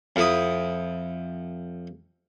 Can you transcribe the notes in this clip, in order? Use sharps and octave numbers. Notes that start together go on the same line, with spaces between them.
F2 E4 D#6